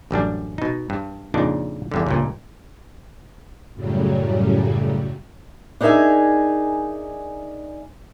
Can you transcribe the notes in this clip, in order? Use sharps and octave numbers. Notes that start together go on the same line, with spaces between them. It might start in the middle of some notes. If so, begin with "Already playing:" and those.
A1 F#2 G3 D4
B2 D#4
G2
F2 A#2 C#3 D4 D#4
E2 G2 D3
C#2 G2 A#2
F#2 A2 C#3 F#3 G3
D4 D#4 G#4 A#4 E5 G#5